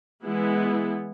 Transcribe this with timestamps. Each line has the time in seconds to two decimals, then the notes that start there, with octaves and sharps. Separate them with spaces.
0.24 E3 G#3 B3 E4